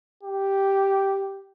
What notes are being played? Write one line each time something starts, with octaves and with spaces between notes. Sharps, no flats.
G4